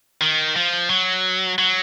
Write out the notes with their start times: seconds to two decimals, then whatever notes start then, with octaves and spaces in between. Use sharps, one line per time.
0.21 D#3
0.56 F3
0.90 F#3
1.59 F#3